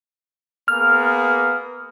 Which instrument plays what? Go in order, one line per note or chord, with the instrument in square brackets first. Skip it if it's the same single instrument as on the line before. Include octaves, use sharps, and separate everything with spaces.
[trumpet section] A#3 B3 G#4 [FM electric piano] F6